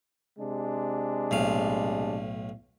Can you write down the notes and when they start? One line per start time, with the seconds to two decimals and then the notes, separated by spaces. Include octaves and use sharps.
0.39 C3 G#3 D4
1.31 B1 A2 F5